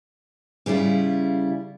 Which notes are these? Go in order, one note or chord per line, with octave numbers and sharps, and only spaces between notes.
C#3 G3 E4 F4